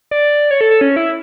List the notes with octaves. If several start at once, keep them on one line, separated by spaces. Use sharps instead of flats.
D5
C#5
A4
A4
C#4
E4